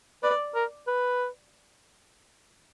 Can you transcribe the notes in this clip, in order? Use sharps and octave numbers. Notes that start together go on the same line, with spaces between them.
B4 D5
A#4
B4